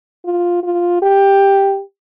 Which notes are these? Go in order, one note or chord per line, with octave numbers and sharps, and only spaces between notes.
F4
F4
G4